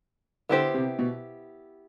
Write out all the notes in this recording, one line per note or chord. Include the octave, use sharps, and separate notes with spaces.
D3 B3 E4 G4 C5
C3
B2